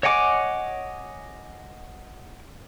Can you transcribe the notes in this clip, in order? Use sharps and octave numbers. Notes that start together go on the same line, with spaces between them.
C#5 D#5 F#5 G#5 D6